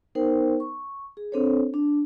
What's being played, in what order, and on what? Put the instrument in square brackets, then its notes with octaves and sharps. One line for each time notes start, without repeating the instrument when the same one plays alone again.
[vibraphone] B3 D#4 A#4 C5 G5
C#6
G#4
C4 D4 A4 C5 C#5
D4